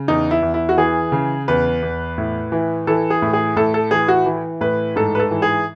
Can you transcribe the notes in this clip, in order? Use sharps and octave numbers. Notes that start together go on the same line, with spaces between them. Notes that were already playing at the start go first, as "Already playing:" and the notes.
Already playing: C#3
E2 D#4
E4
E2
E4
F#4
E3 G#4
C#3
E2 B4
E2
A2
E3
E3 A4
G#4
A2
G#4
A2 A4
A4
E3 G#4
F#4
E3
A2 B4
G#2 A4
B4
A4
E3
G#4